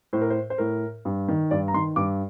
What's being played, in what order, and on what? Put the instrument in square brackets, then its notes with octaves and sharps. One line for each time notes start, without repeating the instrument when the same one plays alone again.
[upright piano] A2 C5
A#4
C5
C5
A2 A#4
G2
D#3
G2 D5
A#5
D#3 C6
G2 D6